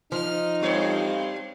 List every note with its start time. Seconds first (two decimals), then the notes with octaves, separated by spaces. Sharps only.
0.12 F3 D#4 F6
0.60 G2 G3 C4 C5 C#5